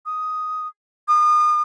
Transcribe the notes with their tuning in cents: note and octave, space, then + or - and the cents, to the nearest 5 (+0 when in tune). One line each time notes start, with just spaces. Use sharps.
D#6 +5
D#6 -35